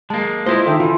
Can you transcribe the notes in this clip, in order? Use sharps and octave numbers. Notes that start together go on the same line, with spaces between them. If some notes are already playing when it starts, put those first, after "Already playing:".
G#3 A#3 A5
E4 F4 C5 D#5
D3 D#3 A4 E5 G5
E3 F4 A4